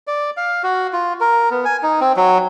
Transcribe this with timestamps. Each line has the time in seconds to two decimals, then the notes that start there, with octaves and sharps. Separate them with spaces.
0.07 D5
0.37 F5
0.63 F#4
0.93 F4
1.21 A#4
1.51 B3
1.65 G#5
1.83 D#4
2.01 C4
2.16 F#3